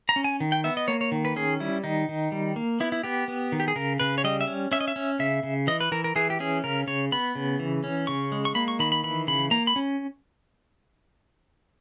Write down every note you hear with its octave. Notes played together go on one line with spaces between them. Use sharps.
A#5
C#4
G#5
D#3
G5
B3 E5
D#5
A#3 C#5
C#5
D#3
B4
C#4 G#4
G3 E4
D#3 D#4
D#3
G3
A#3
B3 E4
E4
B3 G4
B3
D#3
G4
G#4
C#3 A#4
C#3 B4
C#5
G3 D#5
E5
C#4
C#4 E5
D#5
E5
C#4
C#3 E5
C#3
E3 D#5
B4
E3 A#4
A#4
E3 G#4
G4
C#4 G#4
C#3 A#4
C#3 C#5
B3 B5
C#3
E3
C#4
C#3 C#6
G#3
C#6
A#3 B5
C#6
D#3 B5
B5
E3 B5
C#3 B5
A#3 A#5
B5
C#4